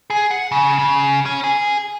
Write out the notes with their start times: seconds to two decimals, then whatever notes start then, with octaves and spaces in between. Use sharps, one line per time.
0.10 G#4
0.31 F#5
0.52 C#3
0.79 C#3
1.26 C#4
1.44 G#4